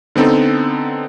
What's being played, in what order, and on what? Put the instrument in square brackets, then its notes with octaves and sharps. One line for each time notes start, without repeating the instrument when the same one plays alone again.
[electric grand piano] D3 B3 C4 D#4 A4